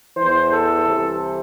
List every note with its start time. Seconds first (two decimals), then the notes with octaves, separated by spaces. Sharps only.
0.17 E2 E3 C5
0.51 A4
0.85 C2 C3 E3